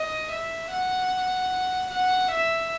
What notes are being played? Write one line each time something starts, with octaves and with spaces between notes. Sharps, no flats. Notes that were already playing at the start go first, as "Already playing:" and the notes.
Already playing: D#5
E5
F#5
F#5
E5